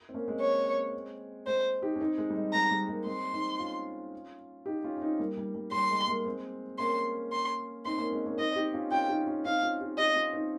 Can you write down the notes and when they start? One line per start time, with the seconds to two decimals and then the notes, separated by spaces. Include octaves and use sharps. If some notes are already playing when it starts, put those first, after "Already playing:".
0.09 C4
0.14 A#3 C#4
0.28 G#3 C4
0.41 C#5
1.47 G#3 C5
1.82 D#4 G4
1.96 C#4
2.00 C4 D#4
2.18 G#3
2.30 G3
2.36 G#3
2.53 G#3 A#5
2.71 G3
2.88 G3 A#3
3.06 G#3 C4 C6
3.33 C4 D#4
3.59 C#4 F4
4.66 D#4 G4
4.84 C#4 F4
4.97 C#4
5.01 C4 D#4
5.19 G3 A#3
5.37 G3
5.55 G3
5.72 G3 C6
5.90 G#3
6.07 G3 A#3
6.25 G#3 C4
6.79 A#3 C#4 C6
7.32 C6
7.85 C4 D#4 C6
7.98 A#3 C#4
8.12 G#3 C4
8.26 A#3 C#4
8.38 C4 D#4 D#5
8.56 D#4 G4
8.74 C#4 F4
8.91 C#4 F4 G5
9.09 D#4 G4
9.27 C#4 F4
9.45 C4 D#4 F5
9.62 C#4 F4
9.81 D#4 G4
9.98 D#4 G4 D#5
10.16 C#4 F4
10.33 C4 D#4